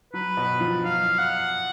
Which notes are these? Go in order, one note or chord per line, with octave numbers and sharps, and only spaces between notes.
F#3 B4
B2
F3
F#3 F5
F#5